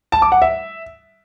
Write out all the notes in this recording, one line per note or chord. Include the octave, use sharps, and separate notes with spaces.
A5
D6
F#5
E5